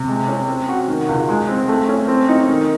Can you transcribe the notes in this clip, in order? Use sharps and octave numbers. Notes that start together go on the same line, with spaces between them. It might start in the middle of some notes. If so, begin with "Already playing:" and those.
Already playing: C3
G#3
C#4
C4
F#4
D#3
C#2
G#3
C4
A3
C#4
C4
D#4
D#3